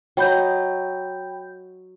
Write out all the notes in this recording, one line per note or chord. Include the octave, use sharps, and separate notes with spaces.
F#3 D#5 G5 B5 G6